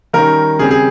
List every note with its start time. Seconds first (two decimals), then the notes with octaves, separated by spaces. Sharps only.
0.13 D#3 G3 C#4 A#4
0.59 C#3 G3 C4 G#4
0.71 G#4